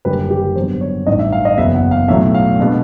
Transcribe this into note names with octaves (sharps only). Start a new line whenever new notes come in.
F#1 F#2 D3 G3 B4
G4
G#1 G2 D3 F#3 B3 C5
C#5
A1 G2 D#3 D#5
E5
F5
D#5
F#1 E2 C#3 F#3 B3 E5
F#5
F5
B1 A2 F#3 E5
F5
B2 G#3 B3 D4